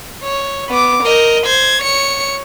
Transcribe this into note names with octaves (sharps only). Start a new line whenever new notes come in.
C#5
B3 D6
A#4 D#5
C5 G#6
C#5 C#7